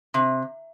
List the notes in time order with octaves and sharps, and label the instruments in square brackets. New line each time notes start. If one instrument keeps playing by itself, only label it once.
[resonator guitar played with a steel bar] C3